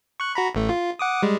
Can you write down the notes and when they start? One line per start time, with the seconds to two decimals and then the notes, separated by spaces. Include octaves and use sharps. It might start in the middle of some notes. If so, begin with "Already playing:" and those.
0.20 C#6 F#6
0.35 F#4 A#5 B5
0.55 A1 A3
0.69 F4
0.99 F#5 D6 D#6
1.23 G3 G#3